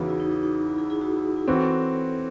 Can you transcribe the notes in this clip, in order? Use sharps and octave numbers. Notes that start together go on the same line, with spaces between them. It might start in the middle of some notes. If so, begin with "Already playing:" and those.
Already playing: E2 C#3 E3 D#4 F#4
E4
D#4
D#4
D#4
D#4
E4
E4 G#4
E4 G#4
D#4 F#4
E4
E4
E3 C4 F#4 A4 C#5